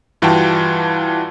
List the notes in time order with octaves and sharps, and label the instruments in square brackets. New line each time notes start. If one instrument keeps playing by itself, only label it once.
[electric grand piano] G2 E3 F4 F#4 G5 A5